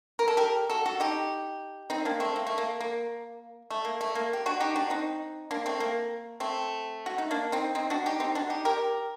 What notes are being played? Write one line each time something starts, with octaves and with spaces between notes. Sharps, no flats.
A#4
A4
G4 A#4
F#4 A4
F#4 A4
D#4 G4
C4 D#4
A#3 D4
A3 C4
A#3
A3
A#3
A#3
A3
A#3
A3
A#3
G4
D4 F#4
D#4 G4
D4 F#4
C4 D#4
A#3 D4
A3 C4
A#3
A3 C4
F#4
D#4
A#3 D4
C4 D#4
C4 D#4
D4 F#4
D#4 G4
C4 D#4
D4 F#4
D#4 G4
G4 A#4